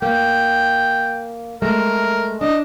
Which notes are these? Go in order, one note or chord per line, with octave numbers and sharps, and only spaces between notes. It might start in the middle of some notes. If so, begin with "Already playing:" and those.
A#3 G5
G#3 A3 A#4 E5
D4 D#5